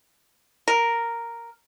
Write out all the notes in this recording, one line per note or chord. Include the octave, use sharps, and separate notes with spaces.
A#4